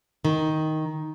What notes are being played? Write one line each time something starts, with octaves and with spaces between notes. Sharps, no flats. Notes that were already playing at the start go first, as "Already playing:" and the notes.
D#3